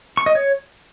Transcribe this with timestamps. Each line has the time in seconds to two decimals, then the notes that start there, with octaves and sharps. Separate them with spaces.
0.17 C#6
0.26 D#5
0.35 C#5